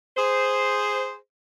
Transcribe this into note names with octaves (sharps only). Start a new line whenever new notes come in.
G#4 C5